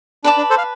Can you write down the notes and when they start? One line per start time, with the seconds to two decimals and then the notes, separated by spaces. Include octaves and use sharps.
0.24 D4 B4 D5 A5 D6
0.37 D4
0.50 A4 C5
0.58 F5